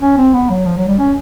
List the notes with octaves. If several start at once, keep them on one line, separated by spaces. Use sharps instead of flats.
C#4
C4
B3
F#3
F3
F#3
G3
C#4